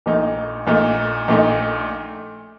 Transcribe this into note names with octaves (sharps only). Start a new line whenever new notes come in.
A#1 A#2 A3 D#4
A#1 A#2 A3 D#4
A#1 A#2 A3 D#4